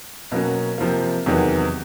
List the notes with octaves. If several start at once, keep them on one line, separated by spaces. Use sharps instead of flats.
B2 F#3 A#3 C#4
C3 F3 A#3
E2 C3 D#3 F#3 B3